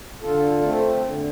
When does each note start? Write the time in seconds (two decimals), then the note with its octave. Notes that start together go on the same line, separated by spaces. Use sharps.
0.21 D3 F4 A4
0.61 A3 C4
1.02 D3